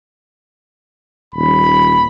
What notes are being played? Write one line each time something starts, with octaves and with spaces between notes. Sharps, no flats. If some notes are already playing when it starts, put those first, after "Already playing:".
D#1 B5